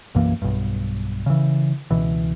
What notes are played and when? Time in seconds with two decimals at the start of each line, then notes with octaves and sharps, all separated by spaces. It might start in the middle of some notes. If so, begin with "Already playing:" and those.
0.15 B1 F#2 E3 A#3
0.42 B1 G2
1.26 C#3 E3
1.91 C#2 B2 E3